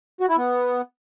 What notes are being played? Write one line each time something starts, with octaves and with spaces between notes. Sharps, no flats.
F#4
E4
B3